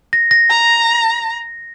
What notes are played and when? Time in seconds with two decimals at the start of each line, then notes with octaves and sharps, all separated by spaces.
0.13 A#6
0.31 A#6
0.50 A#5